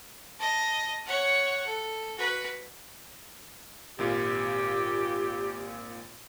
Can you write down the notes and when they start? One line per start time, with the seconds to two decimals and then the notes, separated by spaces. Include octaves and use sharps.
0.39 D#5 A5
1.06 C#5 F#5
1.66 A4
2.18 F#4 B4
3.98 G#1 A#2 F4 G4